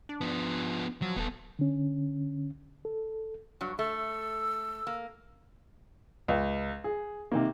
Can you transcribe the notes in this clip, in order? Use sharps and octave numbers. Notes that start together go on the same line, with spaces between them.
D4
F3 B3
F3 F#3
D#1 B3 A4
D3 C#4
A4
G2 F#3
A3 E6
A#3
C#2
G#4
C3 D#3 A#3